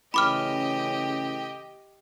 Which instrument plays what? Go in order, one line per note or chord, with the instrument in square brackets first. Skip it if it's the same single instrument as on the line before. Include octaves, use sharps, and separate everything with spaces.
[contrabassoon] A1 [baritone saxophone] C#3 [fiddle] G4 D#5 [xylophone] B5 D6 F6